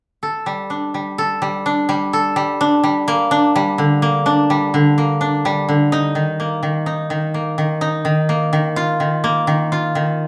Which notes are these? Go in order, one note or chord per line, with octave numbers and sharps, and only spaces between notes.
A4
G3
D4
G3
A4
G3
D4
G3
A4
G3
D4
G3
A#3
D4
G3
D3
A#3
D4
G3
D3
A#3
D4
G3
D3
D#4
D#3
A#3
D#3
D#4
D#3
A#3
D#3
D#4
D#3
A#3
D#3
F4
D#3
A#3
D#3
F4
D#3